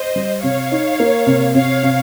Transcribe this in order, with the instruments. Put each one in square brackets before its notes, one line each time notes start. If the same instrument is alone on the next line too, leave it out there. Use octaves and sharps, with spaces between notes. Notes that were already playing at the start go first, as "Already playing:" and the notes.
Already playing: [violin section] C5 D#5
[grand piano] G3
[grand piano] C3 [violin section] C#5 F5
[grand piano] D#4
A#3
C3
[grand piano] C3 [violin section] C#5 F5
[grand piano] C3